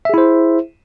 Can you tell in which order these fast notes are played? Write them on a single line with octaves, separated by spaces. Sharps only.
E5 G#4 E4 C5